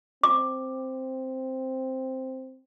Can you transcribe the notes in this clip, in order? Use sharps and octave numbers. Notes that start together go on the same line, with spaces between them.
C4 D6